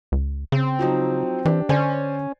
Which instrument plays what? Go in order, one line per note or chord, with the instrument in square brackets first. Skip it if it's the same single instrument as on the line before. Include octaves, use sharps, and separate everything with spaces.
[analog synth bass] C#2
[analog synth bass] C#3 [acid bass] C4
[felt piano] F3 F#3 D#4
[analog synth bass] E3 [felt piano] D4 G4
[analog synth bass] D3 [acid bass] C#4 [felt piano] C5 D5 G#5